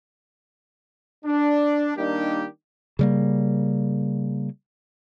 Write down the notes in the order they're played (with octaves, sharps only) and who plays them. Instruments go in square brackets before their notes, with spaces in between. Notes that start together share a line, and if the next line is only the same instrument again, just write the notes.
[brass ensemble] D4
D#3 G3 A#3 D4 D#4 G4
[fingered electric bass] C#3 G3 A#3